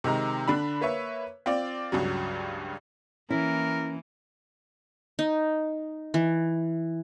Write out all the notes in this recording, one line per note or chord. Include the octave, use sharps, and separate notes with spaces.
C3 D#3 G#3 A#5
D3 D4 B5
A#3 B4 C#5 E5
C4 F4 D5
C#2 G2 C#3 F#3
E3 A#3 C#4 E4 A#4
D#4
E3